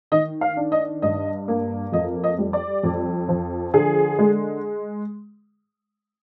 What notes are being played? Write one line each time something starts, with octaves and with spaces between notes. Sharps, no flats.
D#3 D#5
F5
D4
D#5
G2 D#5
A#3
F2 D#5
D#5
G3
D5
F2
F3
D3 G#4
G#3